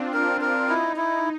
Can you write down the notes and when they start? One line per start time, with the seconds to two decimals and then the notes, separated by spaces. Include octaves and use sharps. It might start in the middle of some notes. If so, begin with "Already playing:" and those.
Already playing: C4 D4 F4
0.14 A#4
0.41 A#4
0.69 D#4 E4
0.96 E4